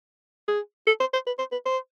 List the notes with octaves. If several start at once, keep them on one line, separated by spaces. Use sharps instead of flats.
G#4
A4
C5
C5
B4
C5
B4
C5